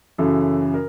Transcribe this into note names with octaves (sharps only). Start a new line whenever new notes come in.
F#2 C#3 E3 A4
A#4